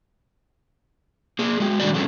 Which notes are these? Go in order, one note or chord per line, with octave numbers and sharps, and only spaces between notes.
A#3 G#4
G#3 F#4
D3 D#3 G3 G#3 F#4 D5
F3 G3 C#4 G#4 A4